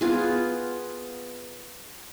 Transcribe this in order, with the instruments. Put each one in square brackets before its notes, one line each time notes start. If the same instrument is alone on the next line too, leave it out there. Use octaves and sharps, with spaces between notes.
[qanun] B3 F4 G#4